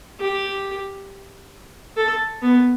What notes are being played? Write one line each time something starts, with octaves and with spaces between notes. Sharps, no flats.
G4
A4
B3